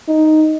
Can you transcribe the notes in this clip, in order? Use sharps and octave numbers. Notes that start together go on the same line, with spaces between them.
D#4